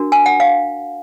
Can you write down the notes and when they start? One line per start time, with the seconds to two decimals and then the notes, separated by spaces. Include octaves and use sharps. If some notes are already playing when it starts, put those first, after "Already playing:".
Already playing: D4 F#4 A#4
0.12 G#5
0.26 F#5
0.40 F5